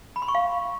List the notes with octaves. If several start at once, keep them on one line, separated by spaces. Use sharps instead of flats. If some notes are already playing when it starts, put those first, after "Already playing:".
B5
C6
C#6
F5